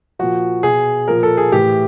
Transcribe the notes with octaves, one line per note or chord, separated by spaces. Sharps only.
A#2 F3 F#4
B2 G#4
A#2 F3 A#4
A4
G#4
A2 E3 G4